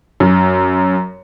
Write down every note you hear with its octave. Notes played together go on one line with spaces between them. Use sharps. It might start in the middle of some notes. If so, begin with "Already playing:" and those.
F#2